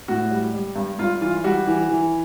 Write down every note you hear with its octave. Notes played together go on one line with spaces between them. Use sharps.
A2 F#4
G3
G3
G2
G2 F4
E3 F4
G3 F#4
E3
E3